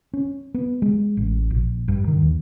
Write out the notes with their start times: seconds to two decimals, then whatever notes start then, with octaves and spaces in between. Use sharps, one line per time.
0.14 C#4
0.54 B3
0.82 G#3
1.17 A1
1.51 A#1
1.88 G2
2.07 D#3
2.22 D#2